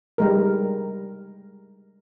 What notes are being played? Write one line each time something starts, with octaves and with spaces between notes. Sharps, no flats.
G3 G#3 A#4